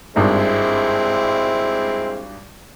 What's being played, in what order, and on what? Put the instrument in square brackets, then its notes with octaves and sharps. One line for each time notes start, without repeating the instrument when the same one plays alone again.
[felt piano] G#1 G2 [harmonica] G#3 C4 E4